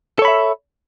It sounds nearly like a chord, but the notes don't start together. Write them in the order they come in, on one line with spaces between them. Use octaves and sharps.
A4 C#5 B5 E5